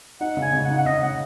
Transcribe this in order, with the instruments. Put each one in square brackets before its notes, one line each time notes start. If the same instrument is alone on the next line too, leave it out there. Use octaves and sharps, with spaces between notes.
[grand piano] D#4 [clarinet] F#5
[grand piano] C#3
[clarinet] G#5
[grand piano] C#3
[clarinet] F#5
[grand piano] D#4
[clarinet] F#5
[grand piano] C#3 [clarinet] D#5
[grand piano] C#3 [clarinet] F#5